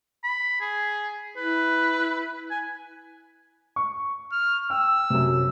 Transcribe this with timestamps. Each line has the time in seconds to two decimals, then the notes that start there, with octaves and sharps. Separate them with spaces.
0.24 B5
0.61 G#4
1.37 E4 B4
2.51 G#5
3.76 C#6
4.32 F6
4.70 G5 E6
5.10 F#2 C3